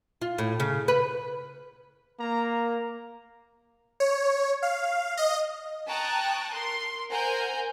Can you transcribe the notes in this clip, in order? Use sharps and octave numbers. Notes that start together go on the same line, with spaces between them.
F4
A2
C#3
B4
A#3 A#5
C#5
F5
D#5
G5 A5 A#5 C#6 D#6 F#6
A#4 C6
A#4 C5 F#5 G#5 A#5 G6